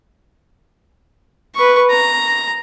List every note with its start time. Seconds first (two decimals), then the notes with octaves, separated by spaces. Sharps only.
1.55 B4 C#6
1.90 A#5